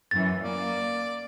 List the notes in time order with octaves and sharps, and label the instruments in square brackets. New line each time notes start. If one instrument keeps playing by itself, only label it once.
[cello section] F#2 E3 [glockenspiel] A6
[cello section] A#3 [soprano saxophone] D5